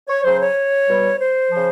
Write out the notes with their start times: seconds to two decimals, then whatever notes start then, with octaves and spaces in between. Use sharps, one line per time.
0.08 C#5
0.24 C#3 F#3 C5
0.40 C#5
0.88 B2 G3
1.20 C5
1.51 C#3 F3